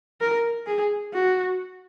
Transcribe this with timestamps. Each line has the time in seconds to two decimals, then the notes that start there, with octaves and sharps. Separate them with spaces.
0.21 A#4
0.67 G#4
1.13 F#4